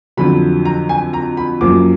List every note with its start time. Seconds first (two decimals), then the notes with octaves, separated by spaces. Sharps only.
0.17 F2 D3 F#3 B5
0.65 A#5
0.89 G#5
1.13 A#5
1.37 B5
1.61 F#2 F3 A#3 D6